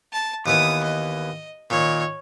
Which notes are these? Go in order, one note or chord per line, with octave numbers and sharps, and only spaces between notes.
A5
D#2 E3 B3 D#6
D#5
A#2 D#3 C#5